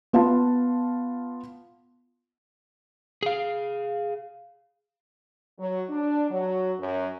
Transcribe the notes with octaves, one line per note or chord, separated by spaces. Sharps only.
B3 F4 F5 A5
G#4 F5
F#3
D4
F#3
F#2